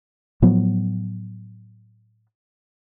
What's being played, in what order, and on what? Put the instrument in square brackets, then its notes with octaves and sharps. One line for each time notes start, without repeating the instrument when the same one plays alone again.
[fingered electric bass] A2 F3 F#3 B3